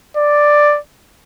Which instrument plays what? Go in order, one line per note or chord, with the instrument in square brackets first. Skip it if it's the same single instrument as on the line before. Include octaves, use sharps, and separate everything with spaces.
[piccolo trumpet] D5